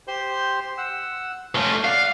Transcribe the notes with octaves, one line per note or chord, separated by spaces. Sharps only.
G4 C5 C6
F#5 E6
A3 C#4 F4
D5 F5 F#5